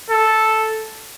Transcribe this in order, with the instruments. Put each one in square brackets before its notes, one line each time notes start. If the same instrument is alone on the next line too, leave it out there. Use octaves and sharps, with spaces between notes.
[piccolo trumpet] A4